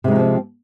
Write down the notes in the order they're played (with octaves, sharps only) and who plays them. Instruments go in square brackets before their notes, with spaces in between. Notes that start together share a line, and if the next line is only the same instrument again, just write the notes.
[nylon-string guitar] C3
G#3
D#4
F3
C4